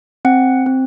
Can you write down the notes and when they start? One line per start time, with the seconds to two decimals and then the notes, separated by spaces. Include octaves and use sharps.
0.25 C4 F#5
0.66 C4